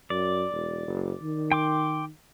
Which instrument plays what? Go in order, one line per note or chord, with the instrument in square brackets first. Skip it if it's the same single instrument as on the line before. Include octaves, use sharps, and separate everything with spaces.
[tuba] F#2 [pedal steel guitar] D5
[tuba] E1
F#1
D#3
[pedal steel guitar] G5 C6 D6